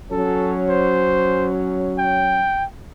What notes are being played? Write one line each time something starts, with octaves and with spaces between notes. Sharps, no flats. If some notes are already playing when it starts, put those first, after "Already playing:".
F#3 C#4 A4
C5
G5